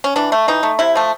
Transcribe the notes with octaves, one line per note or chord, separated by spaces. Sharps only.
C#4
E3 D4
A3
E3 D#4
A3
C3 E4
F3 A3